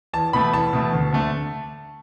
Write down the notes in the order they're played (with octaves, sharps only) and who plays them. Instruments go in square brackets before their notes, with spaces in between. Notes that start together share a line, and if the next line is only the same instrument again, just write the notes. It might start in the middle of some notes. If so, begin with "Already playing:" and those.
[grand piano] E2 A5
B2 A3 B5
E2 A5
B2 A3
D2
D3 A3